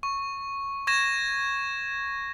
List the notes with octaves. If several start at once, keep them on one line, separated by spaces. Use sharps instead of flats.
C#6
C#6 G#6 A#6 E7